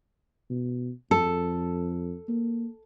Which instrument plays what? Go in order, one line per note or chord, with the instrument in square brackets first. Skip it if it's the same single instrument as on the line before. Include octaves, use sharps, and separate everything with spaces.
[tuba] B2
[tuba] F2 [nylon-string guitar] A4
[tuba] A#3